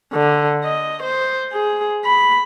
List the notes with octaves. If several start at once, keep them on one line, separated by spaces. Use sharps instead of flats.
D3
D#5
C5
G#4
B5